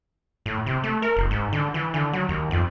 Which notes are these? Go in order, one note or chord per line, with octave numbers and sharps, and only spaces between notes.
A2
C3
A3
A#4
F1
G#2
D3
E3
D3
F#3
D#2
F2